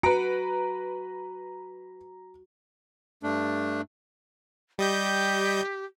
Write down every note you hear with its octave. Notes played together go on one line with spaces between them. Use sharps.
F#4 B4 A#5 C#7 D7
G2 A3 D4
G3 G4 D#5 G6